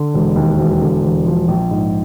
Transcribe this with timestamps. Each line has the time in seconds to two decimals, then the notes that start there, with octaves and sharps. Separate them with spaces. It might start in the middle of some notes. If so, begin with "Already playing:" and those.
Already playing: D3
0.14 E1
0.36 D#2
0.59 E1
0.81 D3
1.04 E1
1.26 F3
1.48 A#1
1.71 G#2